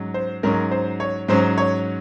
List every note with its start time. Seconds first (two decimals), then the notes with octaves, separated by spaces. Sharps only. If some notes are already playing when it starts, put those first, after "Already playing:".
Already playing: G#2 F#3 C#4
0.14 C5
0.43 G#2 F#3 C#4 A#4
0.71 C5
1.00 C#5
1.28 G#2 F#3 C#4 C5
1.58 C#5